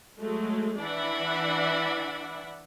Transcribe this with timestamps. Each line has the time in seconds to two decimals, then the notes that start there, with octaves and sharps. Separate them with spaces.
0.19 F#3 G#3 A3
0.80 E3 D4 D5 E5 F#5 B5